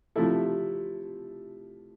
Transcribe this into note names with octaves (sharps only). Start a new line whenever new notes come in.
C3 F3 A3 E4 A4